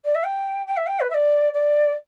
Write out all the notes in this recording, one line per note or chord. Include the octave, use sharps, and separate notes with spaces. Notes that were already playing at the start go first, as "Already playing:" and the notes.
D5
E5
G5
G5
E5
G5
B4
E5
D5
D5